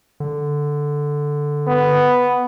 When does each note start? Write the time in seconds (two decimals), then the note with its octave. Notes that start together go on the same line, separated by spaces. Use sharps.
0.20 D3
1.67 B3